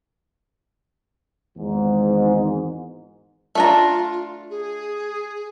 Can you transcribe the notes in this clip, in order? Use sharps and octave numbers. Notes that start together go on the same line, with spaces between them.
G#1 E2 G#2
A3 D4 F4 A#5
G#4